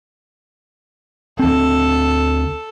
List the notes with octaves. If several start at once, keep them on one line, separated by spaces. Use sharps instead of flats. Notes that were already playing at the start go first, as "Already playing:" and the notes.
D2 C4 A4